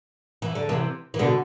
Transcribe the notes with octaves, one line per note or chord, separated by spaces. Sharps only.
E3
D3
C3 E3
E3
B2 D3